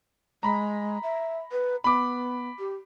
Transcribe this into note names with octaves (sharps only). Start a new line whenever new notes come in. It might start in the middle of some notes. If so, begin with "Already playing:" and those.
G#3 A#5 B5
E5
B4
B3 B5 D6
G4